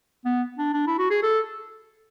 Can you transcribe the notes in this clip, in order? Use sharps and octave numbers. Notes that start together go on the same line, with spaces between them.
B3
D4
D4
E4
F#4
G#4
A4